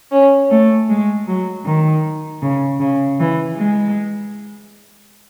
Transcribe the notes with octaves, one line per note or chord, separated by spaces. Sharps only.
C#4
A3
G#3
F#3
D#3
C#3
C#3
E3
G#3